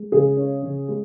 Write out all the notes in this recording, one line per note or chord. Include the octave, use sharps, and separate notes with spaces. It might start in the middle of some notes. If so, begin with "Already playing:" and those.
Already playing: G#3
C#3 G#4
C#4
C#3
G#3